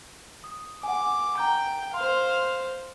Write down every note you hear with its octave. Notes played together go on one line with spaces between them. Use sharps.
D#6
F#5 G#5 D6
G5 A#5 G6
C5 F5 C6